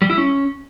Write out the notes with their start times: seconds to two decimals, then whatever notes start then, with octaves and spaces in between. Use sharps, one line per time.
0.02 G3
0.10 E4
0.18 C#4